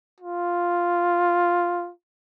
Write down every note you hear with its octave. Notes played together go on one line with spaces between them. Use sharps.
F4